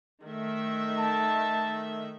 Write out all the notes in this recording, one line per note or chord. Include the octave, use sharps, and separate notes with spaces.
D#3 A3 E5
A5